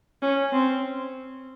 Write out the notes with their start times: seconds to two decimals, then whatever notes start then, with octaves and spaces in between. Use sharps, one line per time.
0.22 C#4
0.53 C4